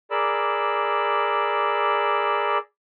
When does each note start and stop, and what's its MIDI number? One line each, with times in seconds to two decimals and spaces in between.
0.11 2.58 68
0.11 2.58 70
0.11 2.58 74
0.11 2.58 83
0.11 2.58 86
0.11 2.58 88